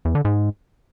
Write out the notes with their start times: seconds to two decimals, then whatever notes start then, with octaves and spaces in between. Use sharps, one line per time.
0.05 E2
0.15 D3
0.25 G#2